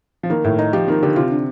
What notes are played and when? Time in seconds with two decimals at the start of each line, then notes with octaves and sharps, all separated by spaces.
0.23 F3
0.30 D#3 A#3
0.44 A2
0.58 D#4
0.73 F3 G4
0.88 D#3 A#3
1.02 D3 G4
1.16 C3 F4
1.31 D3